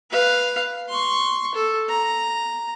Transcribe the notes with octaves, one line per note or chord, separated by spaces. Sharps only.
B4 F5
C6 C#6
A4
A#5